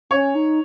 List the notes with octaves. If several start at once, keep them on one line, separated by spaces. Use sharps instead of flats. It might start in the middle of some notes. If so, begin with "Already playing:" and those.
C#4 C#5
D#4